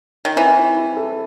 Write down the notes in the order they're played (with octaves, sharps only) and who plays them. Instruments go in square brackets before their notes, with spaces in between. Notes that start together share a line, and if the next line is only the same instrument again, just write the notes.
[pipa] D#3
[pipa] E3 [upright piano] C4
[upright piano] E4
E4
A4